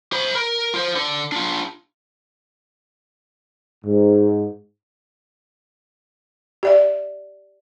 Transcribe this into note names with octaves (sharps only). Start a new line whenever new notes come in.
C5 B5
A#4
F4 C5
D3
D4 F4
G#2
G4 D5 E5